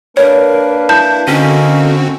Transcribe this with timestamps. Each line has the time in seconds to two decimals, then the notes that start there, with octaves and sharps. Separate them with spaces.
0.17 A#3 D4 A#4 B4 C#5
0.89 E4 A5 G6
1.28 D3 A#3 C4 C#4 D#4 F#4